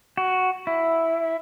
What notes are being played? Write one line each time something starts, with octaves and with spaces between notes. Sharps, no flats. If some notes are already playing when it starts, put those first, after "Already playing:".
F#4
E4